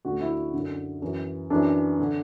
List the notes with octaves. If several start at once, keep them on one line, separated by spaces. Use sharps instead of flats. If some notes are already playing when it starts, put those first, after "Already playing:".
D2 D3 F#4
E4
F#2 D3
F#2 E3
F#2 E3 D4
D3